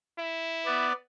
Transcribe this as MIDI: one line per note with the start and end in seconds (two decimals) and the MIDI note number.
0.19 0.89 64
0.66 0.93 59
0.66 0.93 74